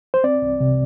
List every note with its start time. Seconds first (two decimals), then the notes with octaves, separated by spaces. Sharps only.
0.14 C5
0.24 C4 D5
0.42 C2
0.60 C3